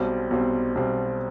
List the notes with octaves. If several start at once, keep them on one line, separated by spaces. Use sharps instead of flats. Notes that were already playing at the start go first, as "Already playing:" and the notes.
Already playing: B1 B2 G3 C4
B1 B2 G3 C4
B1 B2 G3 C4